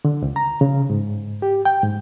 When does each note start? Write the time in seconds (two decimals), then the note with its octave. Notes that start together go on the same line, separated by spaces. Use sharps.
0.05 D3
0.22 C#2
0.36 A#5
0.61 C#3
0.90 G#2
1.42 G4
1.65 G5
1.83 G#2